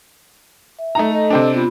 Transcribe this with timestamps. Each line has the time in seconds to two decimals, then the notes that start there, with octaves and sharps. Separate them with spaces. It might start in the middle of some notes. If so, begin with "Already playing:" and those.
0.79 E5
0.95 A3 D#4 A#5
1.11 A4 D#5
1.30 C3 C4 D4
1.53 B3 F4 B5